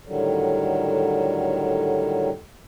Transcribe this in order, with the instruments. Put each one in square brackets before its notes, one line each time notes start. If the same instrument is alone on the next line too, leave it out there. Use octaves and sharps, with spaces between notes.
[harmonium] A2 D3 D#3 F#3 G3